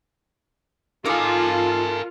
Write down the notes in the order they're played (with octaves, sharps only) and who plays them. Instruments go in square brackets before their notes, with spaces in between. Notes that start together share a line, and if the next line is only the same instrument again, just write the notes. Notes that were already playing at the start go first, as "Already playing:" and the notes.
[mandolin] D#4 A4 D6 [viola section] F4 [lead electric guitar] A#4 G#5